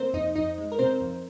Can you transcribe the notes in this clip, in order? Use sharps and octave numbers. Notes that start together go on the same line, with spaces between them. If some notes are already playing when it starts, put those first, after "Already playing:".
Already playing: C3 A#3 C4 A#4 C5
F2 D#4 D#5
F2 D#4 D#5
G#3
A#4
C3 C4 C5
F2